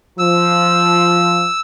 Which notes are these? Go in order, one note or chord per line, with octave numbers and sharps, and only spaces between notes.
F3 E6